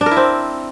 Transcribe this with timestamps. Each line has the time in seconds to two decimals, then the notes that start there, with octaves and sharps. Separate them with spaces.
0.01 D4
0.06 A#4
0.11 E4
0.17 C4